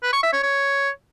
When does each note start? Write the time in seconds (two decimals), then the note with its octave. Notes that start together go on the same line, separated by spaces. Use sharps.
0.03 B4
0.13 C#6
0.23 E5
0.33 C#5
0.43 C#5